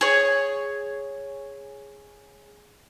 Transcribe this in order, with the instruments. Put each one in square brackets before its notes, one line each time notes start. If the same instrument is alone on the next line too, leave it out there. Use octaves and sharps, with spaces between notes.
[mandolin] G#4 C#5